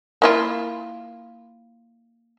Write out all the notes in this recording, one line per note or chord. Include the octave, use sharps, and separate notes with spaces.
A#3 E4 F4